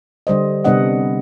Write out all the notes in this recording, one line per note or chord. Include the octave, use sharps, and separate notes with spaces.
D3 G3 C5 D#5
C3 G3 B3 D4 D#5 F#5